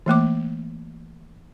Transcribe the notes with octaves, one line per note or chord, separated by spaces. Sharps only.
E3 A3 A#3 D6